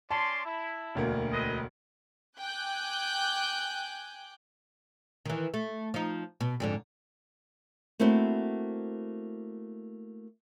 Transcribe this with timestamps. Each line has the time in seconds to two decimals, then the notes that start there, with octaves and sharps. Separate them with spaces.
0.11 C#4 D5 A5 C6
0.45 E4
0.95 E1 D2 A#3
1.33 C4 B4 D#5
2.38 G5 G#5 D6 F#6 G6
5.25 D#3 E3
5.54 A3
5.94 F3 D#4
6.41 B2
6.60 F2 G#2 D3
8.00 A3 A#3 C4 E4 F#4 C5